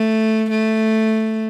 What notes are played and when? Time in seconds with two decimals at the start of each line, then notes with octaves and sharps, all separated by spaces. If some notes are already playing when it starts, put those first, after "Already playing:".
Already playing: A3
0.50 A3